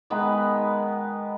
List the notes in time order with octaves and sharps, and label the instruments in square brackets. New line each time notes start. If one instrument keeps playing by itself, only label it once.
[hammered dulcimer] D#3 G#3 B3 B4